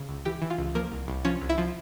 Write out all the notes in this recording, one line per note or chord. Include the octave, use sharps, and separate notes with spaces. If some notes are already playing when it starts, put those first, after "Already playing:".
Already playing: C#3
C#2
E3 G4 G5
E3
F4 F5
C#2
F3 A#3 A#4
C2
C2
F3 C#4 C#5
C2
E4 E5
F3